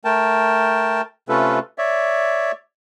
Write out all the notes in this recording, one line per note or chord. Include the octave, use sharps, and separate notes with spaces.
A3 A#4 G5 A5
C3 A3 C#4 F4 A4 B4
C#5 D5 E5